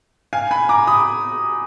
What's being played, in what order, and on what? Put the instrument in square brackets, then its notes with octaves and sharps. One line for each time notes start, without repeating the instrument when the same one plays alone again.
[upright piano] F5 G#5
G#5 B5
A#5 D6
B5 D#6